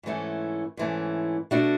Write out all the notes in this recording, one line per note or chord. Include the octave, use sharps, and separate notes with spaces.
G#2 E3 A3 C#4
G#2 E3 A3 C#4
B2 A3 D4 F#4